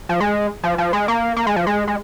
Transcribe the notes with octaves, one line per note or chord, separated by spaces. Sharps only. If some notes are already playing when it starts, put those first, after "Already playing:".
F3
G#3
F3
F3
G#3
A#3
A#3
G#3
F3
G#3
G#3